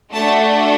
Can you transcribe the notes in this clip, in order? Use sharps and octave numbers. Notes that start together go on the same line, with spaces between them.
A3 D4 F#4 A4 A5